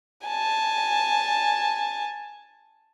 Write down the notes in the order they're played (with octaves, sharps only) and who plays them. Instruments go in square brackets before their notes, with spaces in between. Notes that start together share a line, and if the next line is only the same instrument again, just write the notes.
[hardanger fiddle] G#5 A5